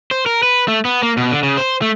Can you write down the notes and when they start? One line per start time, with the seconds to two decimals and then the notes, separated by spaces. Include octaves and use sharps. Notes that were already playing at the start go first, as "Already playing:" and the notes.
0.11 C5
0.26 A#4
0.43 B4
0.68 A3
0.85 B3
1.02 A#3
1.17 B2
1.31 D3
1.43 C#3
1.57 C5
1.82 A3